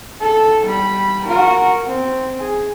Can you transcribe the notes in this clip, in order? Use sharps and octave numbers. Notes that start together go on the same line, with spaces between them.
A4
G3 B5
F#4 A#4
C4
G#4